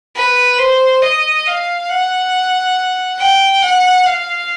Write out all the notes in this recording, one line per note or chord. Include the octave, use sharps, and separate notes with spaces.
B4
C5
D#5
F5
F#5
G5
F#5
F5